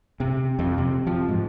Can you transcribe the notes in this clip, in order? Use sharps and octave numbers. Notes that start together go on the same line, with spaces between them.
C3
F2
C3
F3
G#2